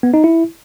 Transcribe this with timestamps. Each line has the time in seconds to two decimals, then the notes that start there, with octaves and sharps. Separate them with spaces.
0.03 B3
0.14 D#4
0.24 E4